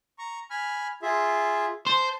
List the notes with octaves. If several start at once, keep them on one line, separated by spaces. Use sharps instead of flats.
A#5 C#6
G#5 B5 F6
F4 G#4 E5
C5 A5